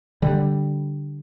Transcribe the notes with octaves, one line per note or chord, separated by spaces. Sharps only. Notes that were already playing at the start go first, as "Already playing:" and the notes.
D3 G3